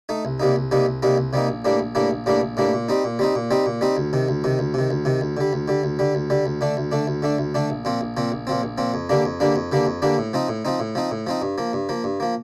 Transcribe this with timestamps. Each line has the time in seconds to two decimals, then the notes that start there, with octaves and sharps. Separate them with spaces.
0.09 A3 D#4
0.25 C2
0.40 C3 G3 A#3 D#4
0.56 C2
0.71 C3 G3 A#3 D#4
0.86 C2
1.02 C3 G3 A#3 D#4
1.18 C2
1.33 C3 G3 A#3 D#4
1.49 A#1
1.65 A2 G3 A#3 D4
1.79 A#1
1.95 A2 G3 A#3 D4
2.11 A#1
2.26 A2 G3 A#3 D4
2.42 A#1
2.57 A2 G3 A#3 D4
2.73 A#2
2.89 G3 C4 D#4
3.04 A#2
3.19 G3 C4 D#4
3.35 A#2
3.51 G3 C4 D#4
3.66 A#2
3.81 G3 C4 D#4
3.97 D2
4.13 C3 D#3
4.29 D2
4.44 C3 D#3
4.59 D2
4.74 C3 D#3
4.90 D2
5.05 C3 D#3
5.21 D2
5.37 D3 G3
5.53 D2
5.68 D3 G3
5.83 D2
5.99 D3 G3
6.15 D2
6.30 D3 G3
6.46 D2
6.61 D3 A3 D4
6.77 D2
6.92 D3 A3 D4
7.07 D2
7.22 D3 A3 D4
7.38 D2
7.54 D3 A3 D4
7.70 A#1
7.85 A#2 F3 C4
8.01 A#1
8.17 A#2 F3 C4
8.32 A#1
8.47 A#2 F3 C4
8.63 A#1
8.78 A#2 F3 C4
8.94 F2
9.09 D3 G3 A#3 D4
9.25 F2
9.40 D3 G3 A#3 D4
9.56 F2
9.72 D3 G3 A#3 D4
9.87 F2
10.02 D3 G3 A#3 D4
10.18 A2
10.33 F3 C4 D#4
10.49 A2
10.65 F3 C4 D#4
10.80 A2
10.95 F3 C4 D#4
11.11 A2
11.27 F3 C4 D#4
11.42 G2
11.58 F3 A#3
11.73 G2
11.89 F3 A#3
12.04 G2
12.20 F3 A#3